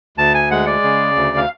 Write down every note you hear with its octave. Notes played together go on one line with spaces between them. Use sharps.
D2 A5
G#5
G#3 F#5
D5
C#3
D2
F5